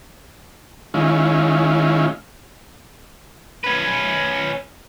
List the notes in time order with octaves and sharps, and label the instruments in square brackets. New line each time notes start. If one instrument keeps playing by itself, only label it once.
[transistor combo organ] D#3 G#3 C#4 E4 F4
[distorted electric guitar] C#4 B4